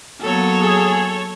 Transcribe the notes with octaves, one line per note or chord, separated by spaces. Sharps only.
F#3 A#3 B3 A4 C#5
G#4